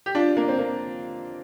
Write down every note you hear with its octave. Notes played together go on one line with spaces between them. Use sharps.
G4
D4 F4
A#3 D4
C4
A#3